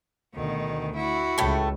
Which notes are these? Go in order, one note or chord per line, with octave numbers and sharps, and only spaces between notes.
D2 B2 D#3
E4 F#4
C#2 A2 A3